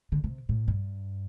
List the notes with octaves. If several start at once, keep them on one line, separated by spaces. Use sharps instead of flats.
D3
C3
A2
G2